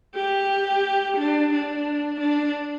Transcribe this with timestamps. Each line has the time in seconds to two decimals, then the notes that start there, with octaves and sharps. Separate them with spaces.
0.16 G4
1.18 D4
1.53 D4
2.20 D4